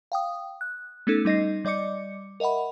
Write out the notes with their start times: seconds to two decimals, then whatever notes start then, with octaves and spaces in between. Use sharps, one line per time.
0.12 F5 G5 D#6
0.61 F#6
1.07 A3 B3 C#4 D#4 A4
1.25 G3 D#4 D#5 A#6 C7
1.65 G3 D5 D#5 D6 C#7
2.40 A#4 D#5 E5 F#5 B5